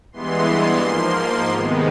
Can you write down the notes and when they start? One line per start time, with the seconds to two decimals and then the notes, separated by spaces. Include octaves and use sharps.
0.12 G2 E3 G#3 B3 C6
0.47 C6
0.81 G#2 F3 A#3
1.50 C3 D#3 G#3 B3